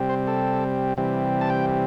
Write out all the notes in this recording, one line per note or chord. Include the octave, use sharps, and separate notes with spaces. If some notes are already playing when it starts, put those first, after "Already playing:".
Already playing: C3 G3 C4
C5
A4
C3 E3 G3 C4
A5
G5